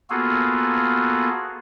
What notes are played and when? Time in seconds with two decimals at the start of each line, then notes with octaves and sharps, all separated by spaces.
0.10 A#3 B3 F4 F#4 G#4 A4